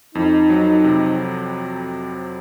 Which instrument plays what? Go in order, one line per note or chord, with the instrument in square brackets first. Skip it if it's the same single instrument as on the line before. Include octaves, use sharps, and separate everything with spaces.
[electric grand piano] F2 [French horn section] D#4
[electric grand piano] F#3
C3